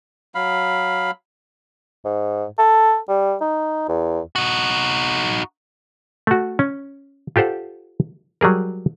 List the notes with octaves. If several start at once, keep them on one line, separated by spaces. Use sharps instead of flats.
F#3 F5 B5
G#2
A4
G3
D#4
E2
D#4 F#4
A3 F#4
C#4
F4 G4 A4 C5 F#5
F#3 G3 G#4 A#4